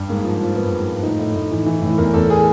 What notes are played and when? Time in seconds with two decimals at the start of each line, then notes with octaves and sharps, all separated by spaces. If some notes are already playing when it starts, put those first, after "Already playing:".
Already playing: G2
0.09 G#2 A#3
0.25 F3
0.40 F3
0.56 G#2 B3
0.71 G#2
0.88 F3
1.03 A2 D#4
1.19 A2
1.35 A2
1.51 E3
1.66 E3
1.82 A2
1.98 E2 A#4
2.13 E2 A4
2.30 G#4